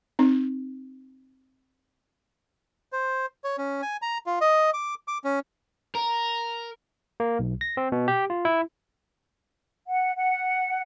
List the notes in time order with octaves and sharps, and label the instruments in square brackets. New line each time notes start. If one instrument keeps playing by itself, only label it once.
[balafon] C4 D#4
[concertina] C5
C#5
C#4
G#5
A#5
F4
D#5
D6
D6
C#4
[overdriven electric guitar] A#4
[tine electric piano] A#3
B1
A#6
C4
B2
G4
F4
E4
[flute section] F#5
F#5